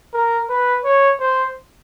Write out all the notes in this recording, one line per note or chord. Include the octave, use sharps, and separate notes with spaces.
A#4
B4
C#5
C5